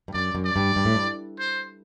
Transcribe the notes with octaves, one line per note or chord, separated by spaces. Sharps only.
G2
F#2 D5
F#2
D5
G2
G2
A2
G2
C5